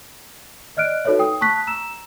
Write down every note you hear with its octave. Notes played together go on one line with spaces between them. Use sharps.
D5 D#5 F6 F#6 D7
D#4 F#4 A4 B4 C#5 E5
G5 D#6
A5 C#6 F#6 B6
A#5 E6 E7